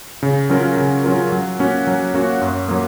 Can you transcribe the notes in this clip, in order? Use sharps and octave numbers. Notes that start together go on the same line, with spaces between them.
C#3
F#3 C#4 F4 A#4
C#3
F#3 C#4 F4 A#4
F#3
A#3 C#4 F#4
F#3
A#3 C#4 F#4
F#2
F#3 A#3